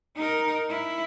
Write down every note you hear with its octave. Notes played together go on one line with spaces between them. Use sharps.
D#4 A#4
E4